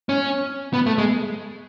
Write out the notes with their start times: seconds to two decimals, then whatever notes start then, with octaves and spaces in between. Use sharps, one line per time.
0.09 C#4
0.73 B3
0.86 A3
0.98 G#3